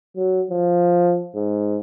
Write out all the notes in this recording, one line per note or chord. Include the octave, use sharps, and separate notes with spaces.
F#3
F3
G#2